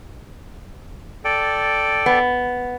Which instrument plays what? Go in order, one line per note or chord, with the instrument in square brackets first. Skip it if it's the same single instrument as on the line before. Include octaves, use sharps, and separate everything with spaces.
[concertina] A4 D5 G5
[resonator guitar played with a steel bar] B3